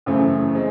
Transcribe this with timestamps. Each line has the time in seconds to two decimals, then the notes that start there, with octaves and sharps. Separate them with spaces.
0.06 F#2 C#3 E3 A3 C4
0.55 G#3 C4